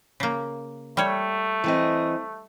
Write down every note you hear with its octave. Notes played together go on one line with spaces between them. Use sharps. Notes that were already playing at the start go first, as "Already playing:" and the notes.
C#3 A#3
G3 A3 C#5
E3 C4 D#5